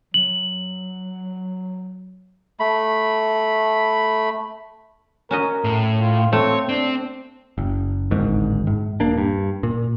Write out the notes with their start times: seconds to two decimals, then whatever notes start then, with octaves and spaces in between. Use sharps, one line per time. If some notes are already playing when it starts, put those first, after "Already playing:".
0.14 F#3 F#7
2.60 A3 B5
5.31 C#4 F#4 A#4 D#5
5.64 A2
6.00 F4
6.33 A3 C4 C#5
6.69 C4 D4
7.58 F#1
8.11 D1 G#1 G#2 D#3
8.67 G#2
9.00 D#1 A#3 D4
9.18 G2
9.63 A#2